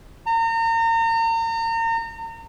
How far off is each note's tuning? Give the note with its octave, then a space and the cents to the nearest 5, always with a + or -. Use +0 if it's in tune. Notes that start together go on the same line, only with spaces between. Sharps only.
A#5 -35